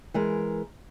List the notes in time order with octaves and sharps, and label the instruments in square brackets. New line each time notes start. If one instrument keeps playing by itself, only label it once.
[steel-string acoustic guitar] E3 G#3 A#4